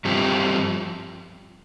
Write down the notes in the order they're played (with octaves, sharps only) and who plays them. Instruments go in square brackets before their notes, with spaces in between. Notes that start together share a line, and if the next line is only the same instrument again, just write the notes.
[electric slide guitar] G2 F3 C4 G4